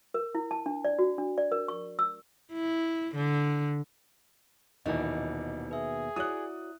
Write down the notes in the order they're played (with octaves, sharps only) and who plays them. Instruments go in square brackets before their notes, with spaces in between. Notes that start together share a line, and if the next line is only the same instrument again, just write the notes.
[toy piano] A#4
E4
A5
D4
D5
F#4
D4
D5
A#4
C#6
E6
[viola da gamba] E4
D3
[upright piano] D#1 E3 [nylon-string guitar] D#2 B2 D#4 [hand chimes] D#5
[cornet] G#4 [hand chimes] B4 E5
[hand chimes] E4 [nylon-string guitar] F#4 C#5 D5 [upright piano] D#6 F#6